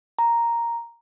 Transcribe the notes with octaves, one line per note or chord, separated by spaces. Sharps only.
A#5